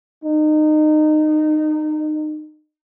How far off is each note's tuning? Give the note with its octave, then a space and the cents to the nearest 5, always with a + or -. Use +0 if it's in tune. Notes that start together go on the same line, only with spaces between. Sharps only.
D#4 -25